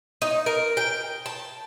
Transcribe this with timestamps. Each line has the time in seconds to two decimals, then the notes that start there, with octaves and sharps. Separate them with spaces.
0.22 D#4
0.46 A#4
0.77 G5
1.26 A5